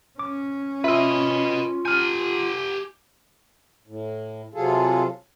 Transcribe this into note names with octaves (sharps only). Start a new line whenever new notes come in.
C#4 D6
F4 B4 D#5 E5 E6
G4 G#5 F6 G6
A2
C3 F#3 F4 G#4 A4